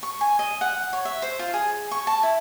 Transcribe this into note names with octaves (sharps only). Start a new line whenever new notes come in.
C#6
G#5
D#5
F#5
C#5
E5
C5
F4
G#4
C#6
A5
E4